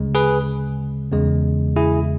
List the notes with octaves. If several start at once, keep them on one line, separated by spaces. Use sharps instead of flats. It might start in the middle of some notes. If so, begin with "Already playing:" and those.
Already playing: D2 C#3 G#3
G#4 B4
E2 C#3 G#3
E4 G#4